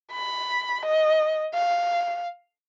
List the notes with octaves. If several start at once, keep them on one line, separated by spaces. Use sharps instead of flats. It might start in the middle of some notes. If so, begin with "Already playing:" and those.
B5
D#5
F5